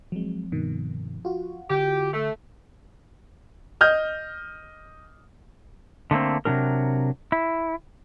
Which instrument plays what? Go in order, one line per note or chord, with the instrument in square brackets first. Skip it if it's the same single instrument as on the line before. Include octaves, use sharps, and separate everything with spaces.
[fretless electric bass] F3 C4 [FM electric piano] F#3 G#3
[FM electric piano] G2 B2 D#3
F4 F#4
[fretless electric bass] D3 [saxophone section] G4
[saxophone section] A3
[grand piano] D#5 F6 G6
[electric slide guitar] D3 A3 A#3 C4
C3 F#3 G3 D4 A#4
E4